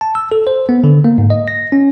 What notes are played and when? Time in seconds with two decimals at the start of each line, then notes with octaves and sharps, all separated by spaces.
0.01 A5
0.15 E6
0.32 A4
0.47 C5
0.69 B3
0.84 D3
1.04 A#3
1.18 G#2
1.30 D#5
1.48 A#6
1.72 C#4